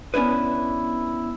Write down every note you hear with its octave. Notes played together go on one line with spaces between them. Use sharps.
B3 C#4 D4 E4 B4